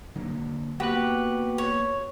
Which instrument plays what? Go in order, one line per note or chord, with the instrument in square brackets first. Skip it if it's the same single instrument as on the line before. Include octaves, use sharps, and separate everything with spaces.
[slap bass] D3 F#3 A#3
[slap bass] A#3 B3 [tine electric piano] F#4 B4 F#6 [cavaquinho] G4
[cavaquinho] C#5